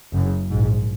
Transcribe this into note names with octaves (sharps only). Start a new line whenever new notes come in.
F#1 F#2 C#3
A#1 G#2